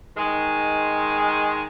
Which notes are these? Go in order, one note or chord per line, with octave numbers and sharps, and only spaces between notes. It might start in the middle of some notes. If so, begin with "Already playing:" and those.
D#3 G#3